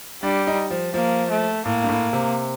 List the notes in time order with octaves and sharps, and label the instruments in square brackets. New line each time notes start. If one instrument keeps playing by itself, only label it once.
[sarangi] G3 [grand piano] D4
[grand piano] D#4
F3
[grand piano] F3 [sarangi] A#3
[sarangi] A3
[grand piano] A2 [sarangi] A#3
[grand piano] G2
A2
C3